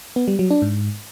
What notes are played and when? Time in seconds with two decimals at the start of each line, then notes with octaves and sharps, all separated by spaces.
0.16 B3
0.28 G3
0.39 F#3
0.51 D4
0.62 G#2